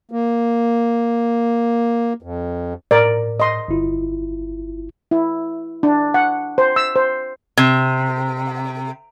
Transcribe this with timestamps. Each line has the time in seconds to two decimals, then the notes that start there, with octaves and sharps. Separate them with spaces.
0.11 A#3
2.22 F2
2.91 A2 A#4 D5
3.40 D#5 C6
3.68 G1 E4 F4
5.11 E4
5.83 D4
6.14 F#5
6.58 C5
6.76 E6
6.96 C5
7.57 C3